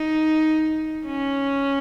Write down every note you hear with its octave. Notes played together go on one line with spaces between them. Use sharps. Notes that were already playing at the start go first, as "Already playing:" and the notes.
Already playing: D#4
C#4